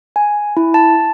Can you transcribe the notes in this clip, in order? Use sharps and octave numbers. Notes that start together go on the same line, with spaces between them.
G#5
E4
A5